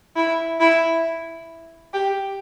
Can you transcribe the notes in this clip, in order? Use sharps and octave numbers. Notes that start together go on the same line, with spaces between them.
E4
E4
G4